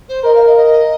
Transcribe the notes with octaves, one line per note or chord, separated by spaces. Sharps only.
C5
A#4 D#5
F5
D#5
D#5